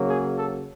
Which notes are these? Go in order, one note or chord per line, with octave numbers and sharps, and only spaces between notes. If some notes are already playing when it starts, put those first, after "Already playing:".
Already playing: C#3 F#3 A#3
G#4
A4